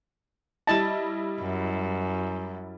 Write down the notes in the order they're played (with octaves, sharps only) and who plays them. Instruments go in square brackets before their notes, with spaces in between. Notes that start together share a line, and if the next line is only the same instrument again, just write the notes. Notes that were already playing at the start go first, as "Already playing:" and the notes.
[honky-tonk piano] G3 E4 D#5 [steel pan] A5
[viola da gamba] F#2